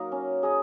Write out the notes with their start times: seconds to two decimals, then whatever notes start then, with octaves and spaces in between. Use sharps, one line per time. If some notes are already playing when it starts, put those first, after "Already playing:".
Already playing: F#3 A#3 D#4 A#4
0.12 C#4
0.43 G#4 D#5